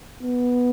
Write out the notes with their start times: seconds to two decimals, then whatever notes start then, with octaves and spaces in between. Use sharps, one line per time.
0.22 B3